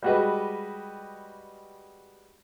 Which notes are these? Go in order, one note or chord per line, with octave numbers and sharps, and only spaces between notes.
G3 G#3 F#4 G4 B4 D#5